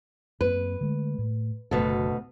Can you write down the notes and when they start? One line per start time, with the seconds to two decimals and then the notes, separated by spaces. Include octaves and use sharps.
0.41 F#2 A#3 C4 B4
0.81 D3 G#3 A3
1.18 A2
1.71 F#1 D2 B2 A4